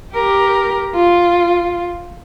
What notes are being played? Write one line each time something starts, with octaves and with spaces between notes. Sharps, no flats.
G4 A#4
F4